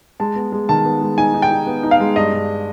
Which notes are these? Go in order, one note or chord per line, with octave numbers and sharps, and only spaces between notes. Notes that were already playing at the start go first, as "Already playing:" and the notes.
G#3 A5
B3
G#3
D#3 A5
B3
G#3
D#4 G#5
D#4
G5
D#4
B3
D#4
F5
G#3
G2 D#5
G2